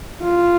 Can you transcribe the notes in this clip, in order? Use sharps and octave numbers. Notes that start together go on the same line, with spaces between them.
F4